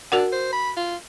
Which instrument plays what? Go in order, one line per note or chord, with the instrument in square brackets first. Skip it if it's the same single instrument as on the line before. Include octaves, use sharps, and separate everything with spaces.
[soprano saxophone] D4 [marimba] F#4 A#4 F#5
[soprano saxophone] C5
B5
F4